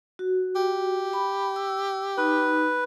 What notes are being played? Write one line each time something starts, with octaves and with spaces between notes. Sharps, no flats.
F#4
G4
B5
E6
D#4 B4